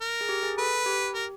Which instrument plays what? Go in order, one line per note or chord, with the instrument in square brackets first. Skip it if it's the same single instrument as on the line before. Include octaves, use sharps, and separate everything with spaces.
[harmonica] A#4
[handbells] G#4
G4
G#4
[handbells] A4 [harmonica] B4
[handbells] G4
[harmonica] A#4